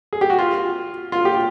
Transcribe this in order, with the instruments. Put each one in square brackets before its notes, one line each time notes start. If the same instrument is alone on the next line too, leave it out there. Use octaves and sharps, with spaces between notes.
[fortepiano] G#4
G4
F#4
F4
F4
G4